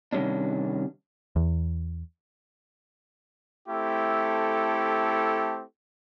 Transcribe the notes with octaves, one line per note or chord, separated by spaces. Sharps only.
C3 D#3 E3 G3 C#4 D4
E2
A3 C4 E4 G4 A4